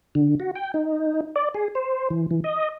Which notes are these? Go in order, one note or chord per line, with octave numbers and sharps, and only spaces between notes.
D3
F#4
G5
D#4
D5
G#4
C5
E3
E3
D#5